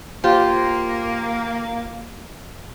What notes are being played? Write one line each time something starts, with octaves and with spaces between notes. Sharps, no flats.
A#3 F4 G4 C5